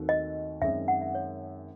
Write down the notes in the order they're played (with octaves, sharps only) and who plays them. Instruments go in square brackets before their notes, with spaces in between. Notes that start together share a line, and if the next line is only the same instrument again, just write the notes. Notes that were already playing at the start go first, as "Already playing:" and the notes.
Already playing: [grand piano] D#2 D#3 A3 C4 F#4
[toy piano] D#5
[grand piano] F#2 D#3 G#3 C4 [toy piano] E5
[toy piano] F#5
E5
C#5